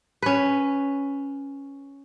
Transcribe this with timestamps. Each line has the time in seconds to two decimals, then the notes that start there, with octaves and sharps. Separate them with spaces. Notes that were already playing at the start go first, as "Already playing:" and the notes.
0.22 C#4 B4